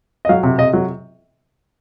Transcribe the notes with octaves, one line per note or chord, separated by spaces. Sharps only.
D#5
F#3 F5
C3
C3 D#5
F#3